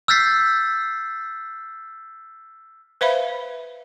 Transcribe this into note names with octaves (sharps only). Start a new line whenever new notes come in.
E6 F6 G6 A6 B6 C7
B4 C5 E5 F5 B5